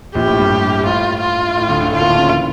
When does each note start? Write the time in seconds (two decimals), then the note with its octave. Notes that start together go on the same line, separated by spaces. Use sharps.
0.15 A#1 A#2 G4
0.26 A2
0.39 G2
0.86 A2 F4
1.21 F4
1.57 A2
1.68 D2 D3
1.80 D2 D3
1.92 A2 A3 F4
2.01 A#2 A#3
2.10 D3 D4
2.19 C#3 C#4
2.27 E3 E4